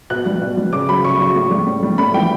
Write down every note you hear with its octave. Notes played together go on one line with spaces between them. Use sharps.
B2 F#6
G3
B2
G3
C#3 D6
F#3 B5
C#3 C#6
F#3
A2
G3
A2
G3
A2 B5
E3 G3 G5